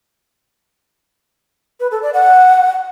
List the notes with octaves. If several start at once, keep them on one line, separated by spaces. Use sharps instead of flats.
B4
A4
D5
F#5